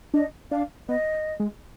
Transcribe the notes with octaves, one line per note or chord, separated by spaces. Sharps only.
D4 D#5
D4 F5
B3 D#5
G#3